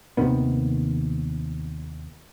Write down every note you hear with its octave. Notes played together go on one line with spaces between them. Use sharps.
D#2 C3 D#3 B3